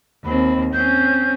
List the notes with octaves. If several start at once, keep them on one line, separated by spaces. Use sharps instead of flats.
D#2 C4 B5
C4 C#4 G6